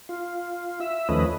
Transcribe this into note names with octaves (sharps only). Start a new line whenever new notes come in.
F4
E5
D#2 F3 A3 C#4 B4 D#5